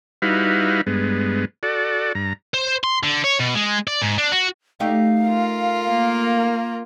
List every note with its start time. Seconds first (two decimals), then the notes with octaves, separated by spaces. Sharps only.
0.22 G3 D#4 E4 F#4 B4 F5
0.87 G2 G#3 B3
1.63 F#4 A4 D5
2.15 G2 A#5
2.54 C5
2.84 C6
3.03 D3
3.24 C#5
3.40 B2
3.55 G#3
3.87 D5
4.02 G#2
4.18 D4
4.32 F#4
4.80 A3 D#4 G4 F5
5.23 F4 A#4
5.89 A#3